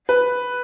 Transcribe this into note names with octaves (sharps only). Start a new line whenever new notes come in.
B4